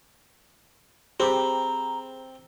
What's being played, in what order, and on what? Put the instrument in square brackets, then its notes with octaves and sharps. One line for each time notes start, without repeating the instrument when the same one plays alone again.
[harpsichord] C4 [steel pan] G4 [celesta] G#4 C5 B5 [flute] A#5